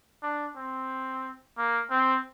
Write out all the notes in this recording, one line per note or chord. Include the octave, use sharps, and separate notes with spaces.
D4
C4
A#3
C4